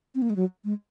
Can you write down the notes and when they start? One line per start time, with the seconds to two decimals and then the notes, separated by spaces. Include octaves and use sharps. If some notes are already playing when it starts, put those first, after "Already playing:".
0.15 C4
0.22 A#3
0.30 G#3
0.36 F#3
0.64 G#3